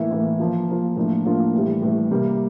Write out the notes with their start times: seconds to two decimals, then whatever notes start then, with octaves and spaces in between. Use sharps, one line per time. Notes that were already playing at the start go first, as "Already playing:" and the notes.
Already playing: A2 E3 A#3 E4
0.11 A2 E3 A#3 E4
0.40 F3 A#3 F4
0.68 F3 A#3 F4
0.96 A2 F3 A#3 D4 F4
1.25 A2 F3 A#3 D4 F4
1.54 A2 E3 G3
1.82 A2 E3 G3
2.11 C3 G3 A#3